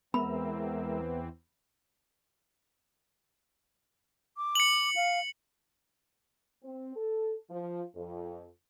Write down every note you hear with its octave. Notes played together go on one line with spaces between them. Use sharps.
E2 E3 G#3 B3 C4 A#4 E5 B5
D6
C#7 F#7
F5
C4
A4
F3
F2